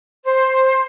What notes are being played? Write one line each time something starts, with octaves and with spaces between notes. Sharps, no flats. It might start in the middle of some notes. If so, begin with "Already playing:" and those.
C5